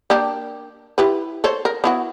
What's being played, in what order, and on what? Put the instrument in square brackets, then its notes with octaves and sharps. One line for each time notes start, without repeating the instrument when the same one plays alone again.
[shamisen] A#3 D4 G4
E4 G4 B4
A4 C5 C#5
A#4
B3 E4 F#4